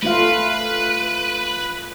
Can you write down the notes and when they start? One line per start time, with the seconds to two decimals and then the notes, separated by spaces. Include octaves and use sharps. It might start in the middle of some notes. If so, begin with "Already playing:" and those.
0.03 A3 F4 B4 F5